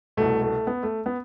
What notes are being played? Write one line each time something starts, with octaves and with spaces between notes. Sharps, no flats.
C2 B2 A3
A3
B3
A3
B3